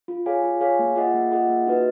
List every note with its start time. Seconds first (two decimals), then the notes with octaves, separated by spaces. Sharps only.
0.08 F4
0.26 G#4 C#5 F5 G#5
0.44 F4
0.61 G#4 C#5 F5 G#5
0.79 A#3
0.96 F4 G#4 D#5 F#5
1.14 A#3
1.31 F4 G#4 D#5 F#5
1.49 A#3
1.67 D#4 F#4 B4 D#5